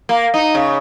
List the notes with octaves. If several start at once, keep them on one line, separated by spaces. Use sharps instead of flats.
A#3
D#4
C#3